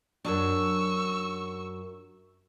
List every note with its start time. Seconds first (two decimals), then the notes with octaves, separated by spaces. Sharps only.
0.25 F#2 F#3 D4 C#6 E6